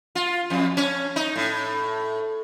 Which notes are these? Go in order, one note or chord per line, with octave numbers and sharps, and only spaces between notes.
F4
F2
C#4
D#4
A2